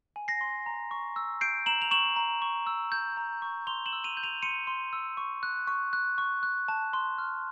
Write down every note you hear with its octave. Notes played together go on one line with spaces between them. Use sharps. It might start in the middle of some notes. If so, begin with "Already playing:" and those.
G#5
A#6 C7
C6
A#5
C#6
E6
G6 C7 D7
A#5 E7 F#7
F7
C#6 E7 F#7
A#5
C#6
E6
G6
A#5
C#6
C6 F7 G7
E7 F#7
E6
D#7 F7
G6
D#7 F7
C6 C#7 D#7
C6
E6
C#6
F#6
C#6
F#6
C#6
F#6
A5
C6
F6